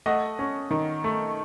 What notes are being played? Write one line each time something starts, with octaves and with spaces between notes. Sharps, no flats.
A3 D#5 F#5
C#4
D#3
A3